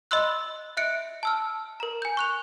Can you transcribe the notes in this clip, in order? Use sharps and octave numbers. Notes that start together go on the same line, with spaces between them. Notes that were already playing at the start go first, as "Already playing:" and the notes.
D#5 B5 C6 E6 F#6
D#5 E5 F#6 C#7 D7
A5 E6 F6
A#4 A#5
G#5 G6
C#6 F#6 F7